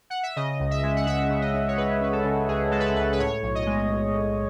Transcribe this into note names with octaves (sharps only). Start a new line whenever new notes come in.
F#5
E5
C#3 D#5
C#2
E5
G#3
F#5
C#2 E5
C#3
D#5
C#2
C#5
G#3 B4
C#2 B4
A4
C#3
C#2 G#4
G#3 A4
B4
A4
C#2 B4
B4
A2 C#5
B1
D#5
G#3
B1
A2